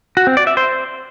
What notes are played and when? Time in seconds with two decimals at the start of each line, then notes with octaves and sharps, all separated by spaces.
0.17 F#4
0.27 C4
0.37 D5
0.47 E5
0.57 C5